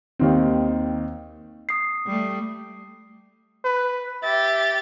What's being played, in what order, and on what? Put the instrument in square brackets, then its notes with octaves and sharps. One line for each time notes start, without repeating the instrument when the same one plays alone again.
[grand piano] D#2 D#3 C4
[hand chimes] D#6 C7
[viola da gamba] G3 A3
[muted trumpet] B4
[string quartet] G4 A6 [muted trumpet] E5